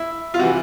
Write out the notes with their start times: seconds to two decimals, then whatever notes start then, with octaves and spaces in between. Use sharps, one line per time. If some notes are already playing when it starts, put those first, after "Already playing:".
Already playing: E4
0.34 F4
0.39 C3 E3 F#4